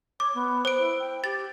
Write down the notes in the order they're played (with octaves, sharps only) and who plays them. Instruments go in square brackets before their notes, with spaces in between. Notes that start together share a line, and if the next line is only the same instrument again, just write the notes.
[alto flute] C#5 [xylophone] D6
[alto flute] B3
[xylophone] C5 D7
[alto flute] E4
G5
[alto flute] G4 [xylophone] A6